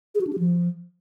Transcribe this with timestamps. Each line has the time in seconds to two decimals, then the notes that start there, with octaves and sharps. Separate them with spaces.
0.15 G#4
0.21 F#4
0.27 D4
0.33 G4
0.39 F3